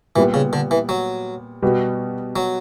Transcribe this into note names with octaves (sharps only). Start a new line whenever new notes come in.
A#2 E3 G3 B3
C#3
D3
E3
F#3
B2 G3 B3 F#4 B4
F#3